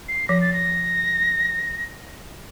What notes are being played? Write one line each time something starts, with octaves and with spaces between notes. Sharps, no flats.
C7
F3 A#6
A6
A#6